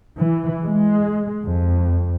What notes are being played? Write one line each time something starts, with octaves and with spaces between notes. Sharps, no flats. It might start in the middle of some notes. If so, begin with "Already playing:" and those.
E3
G#3
F2